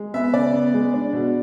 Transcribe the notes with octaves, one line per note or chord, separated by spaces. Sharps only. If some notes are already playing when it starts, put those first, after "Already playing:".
Already playing: G#3
B3 E5
C#3 D5
B3
G#3
D4
B2